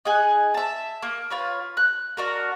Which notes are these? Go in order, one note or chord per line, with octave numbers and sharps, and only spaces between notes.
D#4 G#4 G#5 F#6
E5 A5
A#3
F4 B4 C#5
F#6
D4 F#4 A#4